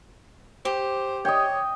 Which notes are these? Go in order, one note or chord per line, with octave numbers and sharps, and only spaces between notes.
G4 C5
C#5 D#5 G5